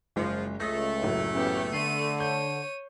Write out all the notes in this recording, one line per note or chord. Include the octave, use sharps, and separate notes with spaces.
F#1 F3 G#3
C#2 A3 D#6 A#6
F#1 A2 F#3
A1 C#3 B3 C#4 G4
D3 C7 D#7
C#5 G6 D#7